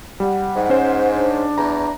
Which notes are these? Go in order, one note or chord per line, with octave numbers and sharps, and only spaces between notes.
G3 F#5
G#2
C#4 C5
D4
E2 A#5